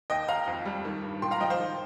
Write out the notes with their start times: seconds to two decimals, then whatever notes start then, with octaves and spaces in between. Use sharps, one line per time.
0.10 D#2 D#5 G5
0.28 D#2 F5 A#5
0.47 F2
0.65 G3
0.85 D#3
1.03 G2
1.22 A#2 G5 C6
1.31 F5 A#5
1.40 F3 D#5 G5
1.50 C5 F5
1.60 D#3